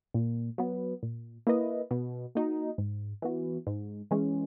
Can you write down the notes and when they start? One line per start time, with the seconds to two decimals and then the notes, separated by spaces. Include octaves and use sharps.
0.14 A#2
0.58 F#3 B3
1.03 A#2
1.47 A#3 E4 B4 D#5
1.91 B2
2.35 A#3 D#4 F#4
2.78 G#2
3.22 E3 B3 F#4
3.67 G#2
4.11 E3 G#3 C#4